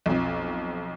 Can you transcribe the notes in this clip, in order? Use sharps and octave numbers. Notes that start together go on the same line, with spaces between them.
B1 F2